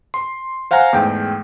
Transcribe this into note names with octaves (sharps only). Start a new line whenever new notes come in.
C6
C5 F5 F#5 G#5 A#5
E2 G#2 A3 G5